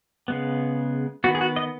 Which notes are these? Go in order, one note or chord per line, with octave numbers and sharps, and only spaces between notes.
C#3 G#3 B3
D#3 B3 F#4
G#4
F#4
D#5